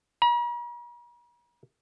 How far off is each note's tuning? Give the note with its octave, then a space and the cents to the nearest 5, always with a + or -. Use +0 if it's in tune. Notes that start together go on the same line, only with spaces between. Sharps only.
A#5 +45